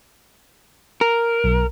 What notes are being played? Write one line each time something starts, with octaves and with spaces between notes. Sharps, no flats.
A#4
B1